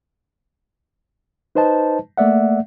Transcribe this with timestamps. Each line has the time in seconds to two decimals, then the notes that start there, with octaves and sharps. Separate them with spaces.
1.55 D#4 B4 C5 D#5 A5
2.17 A3 A#3 D5 E5 F#5